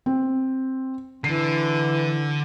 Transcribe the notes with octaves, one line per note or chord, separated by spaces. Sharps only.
C4
D3 E3 C7